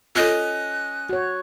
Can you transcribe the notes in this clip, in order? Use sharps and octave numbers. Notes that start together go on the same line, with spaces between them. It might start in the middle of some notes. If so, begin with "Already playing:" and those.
C#4 F4 A4 D#5 F#6
F#4 C#5